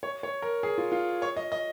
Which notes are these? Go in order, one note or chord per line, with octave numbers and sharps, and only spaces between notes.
C#5
C#5
A#4
G#4
F4
F4
C#5
D#5
D#5